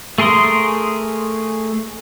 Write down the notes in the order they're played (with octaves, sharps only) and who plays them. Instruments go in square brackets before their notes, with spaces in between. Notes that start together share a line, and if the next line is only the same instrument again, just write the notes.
[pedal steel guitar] A3 G#4 A#4 C6 D#6